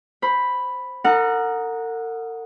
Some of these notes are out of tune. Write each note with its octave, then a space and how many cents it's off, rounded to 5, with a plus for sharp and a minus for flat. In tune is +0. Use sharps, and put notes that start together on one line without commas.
C5 +10 B5 +0
D#4 +0 A#4 -45 F#5 -15